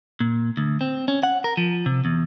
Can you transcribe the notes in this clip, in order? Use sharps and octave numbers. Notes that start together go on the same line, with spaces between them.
A#2
D2
C4
C#4
F#5
A#4
F3
C3
E2